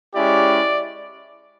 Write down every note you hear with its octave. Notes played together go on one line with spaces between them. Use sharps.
G#3 C#4 E4 G4 D5